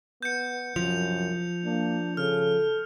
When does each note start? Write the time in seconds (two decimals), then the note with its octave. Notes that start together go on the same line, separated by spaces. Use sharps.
0.23 B3 G6 C#7
0.76 C2 F#2 F3 F7
1.65 A#3 D4
2.17 C#3 A4 F6